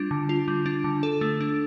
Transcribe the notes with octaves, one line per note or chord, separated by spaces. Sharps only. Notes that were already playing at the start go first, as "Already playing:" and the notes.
Already playing: G3 D4 F4
D3
F4
G3
D4
D3
A4
A3
D4